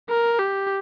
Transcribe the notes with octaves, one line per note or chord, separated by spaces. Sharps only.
A#4
G4